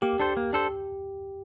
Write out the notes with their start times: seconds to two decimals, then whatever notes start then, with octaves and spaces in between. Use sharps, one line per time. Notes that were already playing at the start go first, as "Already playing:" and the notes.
0.02 A#3 G4
0.20 D4 A4 C5
0.37 A#3
0.53 D4 A4 C5